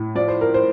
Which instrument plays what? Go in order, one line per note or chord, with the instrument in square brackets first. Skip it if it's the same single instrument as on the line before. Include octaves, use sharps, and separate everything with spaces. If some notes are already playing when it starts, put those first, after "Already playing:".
Already playing: [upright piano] A2
F3 D5
C5
A#4
C5